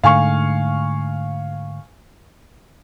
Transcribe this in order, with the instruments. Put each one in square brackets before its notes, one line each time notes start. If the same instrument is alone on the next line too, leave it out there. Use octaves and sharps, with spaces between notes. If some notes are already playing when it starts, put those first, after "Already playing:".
[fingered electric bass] G#2 D3 A3 [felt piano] F5 G#5 C#6